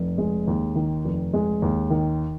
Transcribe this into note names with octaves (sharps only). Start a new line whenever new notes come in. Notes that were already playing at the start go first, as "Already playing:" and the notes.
Already playing: F1
G#3
D#2
D#3
F1
G#3
D#2
D#3